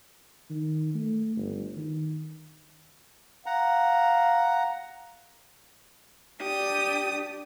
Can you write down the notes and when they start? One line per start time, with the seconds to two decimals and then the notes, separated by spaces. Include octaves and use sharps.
0.50 D#3
0.94 A3
1.36 G1
1.76 D#3
3.46 F5 F#5 A#5
6.41 D4 G4 D5 D#6